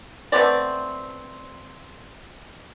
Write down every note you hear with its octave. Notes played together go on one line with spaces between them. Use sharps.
A3 B3 C4 D5